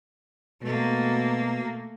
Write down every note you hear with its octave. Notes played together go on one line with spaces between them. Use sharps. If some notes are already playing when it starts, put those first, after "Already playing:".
B2 A3 A#3